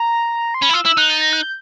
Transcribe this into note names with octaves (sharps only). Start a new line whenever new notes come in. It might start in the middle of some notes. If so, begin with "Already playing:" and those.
Already playing: A#5
C6
C#4 B5
E4
F4 E6
E4 E6
D#4 F#6
A6
A#6
F#6
G6